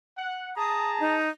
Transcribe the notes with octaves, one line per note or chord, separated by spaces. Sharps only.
F#5
G#4 A5 A#5 D#6
D#4